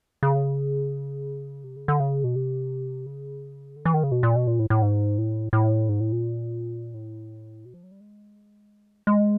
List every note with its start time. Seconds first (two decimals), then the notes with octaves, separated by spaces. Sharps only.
0.23 C#3
1.64 C3
1.76 C#3
1.88 D3
2.00 C#3
2.24 B2
2.35 C3
3.06 C#3
3.76 D3
3.85 E3
3.94 D#3
4.03 C#3
4.11 B2
4.23 A#2
4.36 B2
4.47 A#2
4.59 A2
4.70 A2
4.82 G#2
5.18 A2
5.53 A2
5.89 G#2
6.00 A2
6.12 A#2
6.94 A2
7.65 B2
7.74 F3
7.83 F#3
7.91 G3
8.00 G#3
9.07 G#3